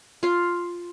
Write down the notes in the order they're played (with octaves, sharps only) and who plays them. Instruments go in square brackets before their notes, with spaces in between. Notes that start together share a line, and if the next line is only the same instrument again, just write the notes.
[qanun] F4 F5